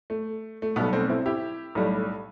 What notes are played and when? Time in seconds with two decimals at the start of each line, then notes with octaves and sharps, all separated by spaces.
0.10 A3
0.62 A3
0.76 B1 B2 G3 B3
0.93 A3 C4
1.09 C4 E4
1.26 E4 G4
1.75 B1 A2 G3